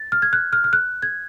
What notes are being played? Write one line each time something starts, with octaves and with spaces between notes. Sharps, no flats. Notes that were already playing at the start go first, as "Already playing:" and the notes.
Already playing: A6
F6
G#6
F#6
F6
F6
F#6
G#6